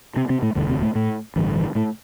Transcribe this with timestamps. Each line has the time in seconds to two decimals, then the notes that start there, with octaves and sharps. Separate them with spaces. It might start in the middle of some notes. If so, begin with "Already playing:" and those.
0.16 C3 C4
0.30 C3 C4
0.42 A2 A3
0.55 E1 D2 G2 D3 G3
0.69 C3 C4
0.82 A2 A3
0.95 A2 A3
1.36 A1 G2 D3 E3
1.56 E3
1.75 A2 A3